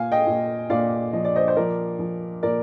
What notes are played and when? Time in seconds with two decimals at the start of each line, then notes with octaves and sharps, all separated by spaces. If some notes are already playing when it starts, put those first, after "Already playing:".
Already playing: A#2 F5 G#5
0.12 D#5 G5
0.27 A#2
0.70 A#2 D5 F5
1.13 F3 D#5
1.25 D5
1.36 C5 D#5
1.48 C5
1.56 F3 A#4 D5
1.99 F3
2.43 A#2 A#4 D5